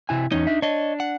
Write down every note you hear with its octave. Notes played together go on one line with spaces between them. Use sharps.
C3 E4 G#5
E2 C#4 D#4
D4 E5
D4 C#5 D#5
F#5